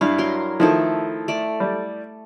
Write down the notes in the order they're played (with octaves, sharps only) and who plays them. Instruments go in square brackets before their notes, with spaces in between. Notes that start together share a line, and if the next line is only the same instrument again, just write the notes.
[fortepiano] G2 [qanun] E4 F5
[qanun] F#3 A#4 C6
[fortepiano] D#3 F3 [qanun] A3 E4 A4
[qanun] A3 D5
[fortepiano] G3